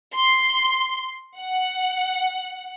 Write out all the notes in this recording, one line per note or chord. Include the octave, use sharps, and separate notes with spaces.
C6
F#5